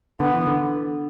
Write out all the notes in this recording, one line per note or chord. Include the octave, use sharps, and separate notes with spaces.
D3 B3
E3
D3